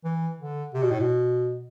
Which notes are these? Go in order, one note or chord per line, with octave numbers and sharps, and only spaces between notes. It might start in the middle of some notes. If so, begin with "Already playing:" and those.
E3
D3
C3
B2
A2
B2